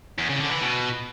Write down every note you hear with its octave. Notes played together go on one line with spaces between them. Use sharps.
E2
C#3
D3
E3
B2